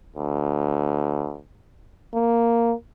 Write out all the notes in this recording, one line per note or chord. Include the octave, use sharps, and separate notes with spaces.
D2
A#3